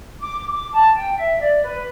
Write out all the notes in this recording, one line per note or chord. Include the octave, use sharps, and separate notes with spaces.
D6
D6
A5
G5
E5
D5
B4